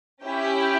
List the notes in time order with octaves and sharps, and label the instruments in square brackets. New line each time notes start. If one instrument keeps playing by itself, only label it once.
[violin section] C#4 E4 G4 G5